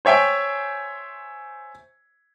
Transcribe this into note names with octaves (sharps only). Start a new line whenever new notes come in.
C5 C#5 E5 G5 G#5